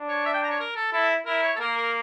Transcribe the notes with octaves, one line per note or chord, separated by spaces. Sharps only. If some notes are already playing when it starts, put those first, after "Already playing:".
Already playing: D4
C#5
E5
G5
A#5
C#5
A#4
A4
E4 A4
E4 A#4
C#5
A4
A#3 A#4
A#4